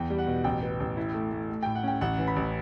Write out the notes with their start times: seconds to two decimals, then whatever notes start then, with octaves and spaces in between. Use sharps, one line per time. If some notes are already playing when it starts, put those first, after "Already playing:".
Already playing: E2 G5
0.10 G3
0.18 F#5
0.27 B2
0.44 A1 G5
0.63 B3
0.80 A1
0.97 E4
1.14 A3
1.32 A3
1.49 A3
1.63 A2 G5
1.75 F#5
1.84 C#4 G5
2.01 A1 F#5
2.18 E3
2.28 B5
2.36 A1